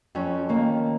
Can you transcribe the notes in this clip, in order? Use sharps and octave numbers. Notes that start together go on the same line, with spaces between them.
F2 C#4
D#3 A#3